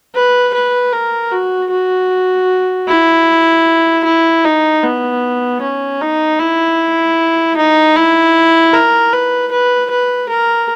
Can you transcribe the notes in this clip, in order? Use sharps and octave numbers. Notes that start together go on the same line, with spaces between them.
B4
B4
A#4
F#4
F#4
E4
E4
D#4
B3
C#4
D#4
E4
D#4
E4
A#4
B4
B4
B4
A#4